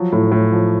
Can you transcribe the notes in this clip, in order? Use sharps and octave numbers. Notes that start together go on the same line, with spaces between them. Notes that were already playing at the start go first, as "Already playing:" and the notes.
Already playing: F3 F#3
A2
A2
F3